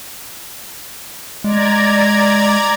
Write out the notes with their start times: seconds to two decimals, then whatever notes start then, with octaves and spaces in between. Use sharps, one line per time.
1.44 G#3 D5 A#5 G#6